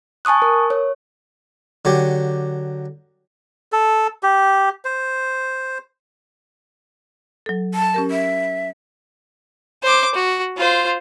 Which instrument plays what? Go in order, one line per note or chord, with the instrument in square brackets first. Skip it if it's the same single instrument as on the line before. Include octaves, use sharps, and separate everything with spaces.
[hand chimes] G#5 A5 C#6 D#6 F#6
A#4
C#5
[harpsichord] D3 F#3 G4
[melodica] A4
G4
C5
[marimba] F#3 A4
[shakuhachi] A5
[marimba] C#4 G4 A#4
[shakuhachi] E5
[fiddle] C5 D6
F#4
F4 C5